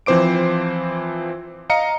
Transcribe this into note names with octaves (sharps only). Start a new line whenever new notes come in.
E3 F3 C4 C5 D6 D7
D#5 F5 A#5 C#7